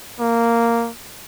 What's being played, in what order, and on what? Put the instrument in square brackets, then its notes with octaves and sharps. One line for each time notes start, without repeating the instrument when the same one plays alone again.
[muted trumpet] A#3